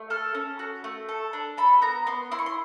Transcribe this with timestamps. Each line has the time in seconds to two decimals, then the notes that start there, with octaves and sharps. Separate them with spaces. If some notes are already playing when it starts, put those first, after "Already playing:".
Already playing: A3
0.10 A4 F6
0.35 C#4
0.59 F#4
0.84 A3
1.09 A4
1.33 D4
1.57 A4 B5
1.82 B3 A#5
2.07 B3 C6
2.31 E4 C6
2.39 C#6
2.46 C6